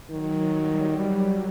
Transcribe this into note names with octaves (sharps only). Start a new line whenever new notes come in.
D#3 F#3
G3
G3